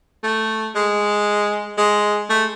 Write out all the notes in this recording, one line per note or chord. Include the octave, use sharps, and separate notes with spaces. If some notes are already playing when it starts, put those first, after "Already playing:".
A3
G#3
G#3
A3